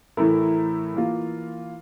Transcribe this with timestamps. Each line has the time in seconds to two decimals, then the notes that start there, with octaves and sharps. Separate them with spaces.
0.17 A2 E3 A3 E4 A#4
0.94 E3 A#3 F4